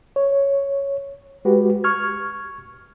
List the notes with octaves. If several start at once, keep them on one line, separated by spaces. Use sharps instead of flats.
C#5
G#3 F#4 G4 B4
C#6 F6 G#6